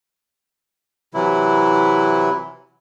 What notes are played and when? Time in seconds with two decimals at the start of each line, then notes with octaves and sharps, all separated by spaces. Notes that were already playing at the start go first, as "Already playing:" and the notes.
1.14 C3 E3 F#3 E4